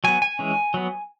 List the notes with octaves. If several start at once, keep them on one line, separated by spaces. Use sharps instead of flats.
F#3 B3 G#5
G#5
E3 G#3 C#4
F#3 B3